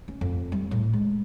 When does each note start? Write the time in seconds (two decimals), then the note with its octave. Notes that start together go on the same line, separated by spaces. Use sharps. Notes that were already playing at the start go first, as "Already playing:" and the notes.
0.08 C#4
0.21 F2
0.52 G3
0.71 A2
0.93 G#3